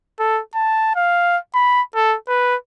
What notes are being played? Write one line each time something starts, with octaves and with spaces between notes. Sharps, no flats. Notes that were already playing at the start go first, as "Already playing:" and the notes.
A4
A5
F5
B5
A4
B4